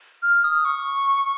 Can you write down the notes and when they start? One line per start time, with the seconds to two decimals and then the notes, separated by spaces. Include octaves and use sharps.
0.23 F6
0.44 D#6
0.65 C#6